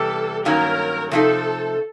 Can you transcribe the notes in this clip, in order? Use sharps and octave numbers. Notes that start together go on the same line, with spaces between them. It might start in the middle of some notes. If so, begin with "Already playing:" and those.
Already playing: E2 C3 E3 G3 A4
G2 D#3 F#3 A#3 C#4 A#4
C3 F3 A3 C4 D#4 A4